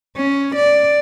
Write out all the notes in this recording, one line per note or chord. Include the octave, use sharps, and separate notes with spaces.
C#4
D5